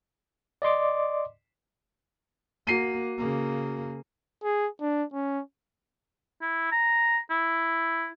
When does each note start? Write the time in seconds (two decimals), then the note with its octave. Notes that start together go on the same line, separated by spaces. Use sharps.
0.62 D5 D#5 C6 D6
2.67 A#3 F#4 C7 D#7
3.19 C#3 A#3
4.43 G#4
4.81 D4
5.13 C#4
6.42 E4
6.72 A#5
7.30 E4